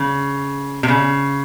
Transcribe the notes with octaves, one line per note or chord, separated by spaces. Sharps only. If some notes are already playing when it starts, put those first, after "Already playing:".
Already playing: C#3
C3
C#3